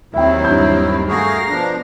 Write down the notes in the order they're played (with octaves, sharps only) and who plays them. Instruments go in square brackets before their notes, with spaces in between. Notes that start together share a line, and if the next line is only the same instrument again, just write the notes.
[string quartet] D#2 D#3 C4 [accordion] F#3 E4 [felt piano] E5 G5
[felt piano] G2 G6
[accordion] A3 F#4 G#4 [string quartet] A#4 F5 A#6
[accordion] B2 F3 D4